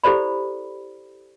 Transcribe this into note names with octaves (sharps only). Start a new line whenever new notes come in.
E4 G4 A4 C5 D5 B5